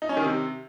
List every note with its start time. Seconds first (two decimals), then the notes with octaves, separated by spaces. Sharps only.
0.02 D#4
0.09 C#4
0.17 D#3
0.24 C3